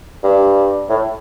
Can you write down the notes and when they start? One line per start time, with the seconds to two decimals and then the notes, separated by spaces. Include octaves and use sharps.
0.23 G2
0.89 A2